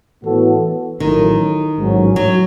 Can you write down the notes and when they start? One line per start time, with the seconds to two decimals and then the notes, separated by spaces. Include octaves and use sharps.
0.22 A2 E3 B3 F#4 A4
0.99 A1 A2 D#3 F#3
1.78 A1 G#2 F#3 C#4
2.16 F#3